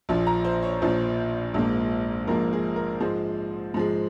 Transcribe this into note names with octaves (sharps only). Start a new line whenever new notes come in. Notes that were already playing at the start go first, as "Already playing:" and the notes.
A#1 A#2 F3
A#5
C5
C#5
A#1 A#2 F3 C5
A#1 G#2 F3 A#3
A#1 G#2 F3 A#3 A#4
G#4
A#4
G#2 F3 G#3 C5
G#2 F3 G#3